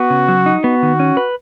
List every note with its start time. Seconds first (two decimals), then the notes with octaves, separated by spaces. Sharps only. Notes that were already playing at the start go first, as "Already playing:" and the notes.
Already playing: B3 F#4
0.10 C#3
0.28 F#3
0.46 D#4
0.64 B3 F#4
0.83 D#3
1.00 C#4
1.17 B4